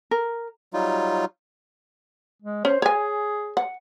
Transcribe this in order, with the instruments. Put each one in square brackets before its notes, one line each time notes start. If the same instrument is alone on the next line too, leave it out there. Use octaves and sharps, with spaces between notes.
[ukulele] A#4
[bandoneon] F#3 G3 D#4 F4
[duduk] G#3
[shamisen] C#4 [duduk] C5
[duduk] G#4 [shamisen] C#5 G#5
[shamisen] F#5